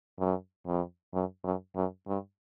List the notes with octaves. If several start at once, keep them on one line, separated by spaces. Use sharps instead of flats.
F#2
F2
F#2
F#2
F#2
G2